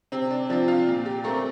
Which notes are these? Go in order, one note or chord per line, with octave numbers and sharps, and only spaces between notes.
C3 C4
D4
F3 C4 D4
F4
A#2
G4
A3 C4 A#4